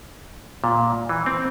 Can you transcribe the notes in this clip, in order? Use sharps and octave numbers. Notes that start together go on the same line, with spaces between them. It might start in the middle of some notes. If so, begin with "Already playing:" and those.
A#2
E3
C4